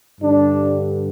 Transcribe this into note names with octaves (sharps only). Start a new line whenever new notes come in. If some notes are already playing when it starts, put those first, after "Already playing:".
G2 D3 G3 D4